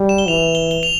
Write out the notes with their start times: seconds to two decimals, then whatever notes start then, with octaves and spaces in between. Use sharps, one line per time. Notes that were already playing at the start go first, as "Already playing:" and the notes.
Already playing: G3
0.09 E7
0.18 G7
0.28 E3 F7
0.55 G7
0.71 G7
0.83 F7